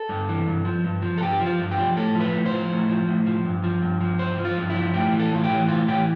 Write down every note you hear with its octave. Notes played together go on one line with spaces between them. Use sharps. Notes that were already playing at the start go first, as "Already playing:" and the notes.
Already playing: A4
G2
E3
G2
F3
G2
F3
A4
G2 G4
F3
F4
G2
G4
F3
A2 A4
F3
B4
A2
C5
F3
A2
F3
A2
F3
G2
F3
G2
F3
G2 C5
F3
F4
G2
E4
F3
A2 G4
E3
A4
A2 F4
G4
E3
A2 F4
E3 G4